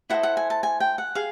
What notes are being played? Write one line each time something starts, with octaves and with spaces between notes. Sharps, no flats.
E4 A4 C5 D#5 F#5
F#5
G#5
A5
G#5
G5
F#5
G#4 F5